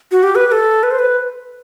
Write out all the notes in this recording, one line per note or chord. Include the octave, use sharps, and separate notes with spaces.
F#4
G4
B4
B4
A4
B4
C5
B4